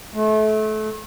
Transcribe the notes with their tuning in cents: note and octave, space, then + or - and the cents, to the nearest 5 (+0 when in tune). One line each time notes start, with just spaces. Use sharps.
A3 -30